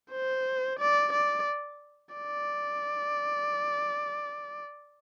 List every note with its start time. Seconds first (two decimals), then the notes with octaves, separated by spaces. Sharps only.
0.12 C5
0.79 D5
1.13 D5
2.15 D5